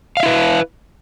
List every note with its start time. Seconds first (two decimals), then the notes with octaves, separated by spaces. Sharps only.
0.17 F5
0.20 E5
0.23 E4
0.26 B4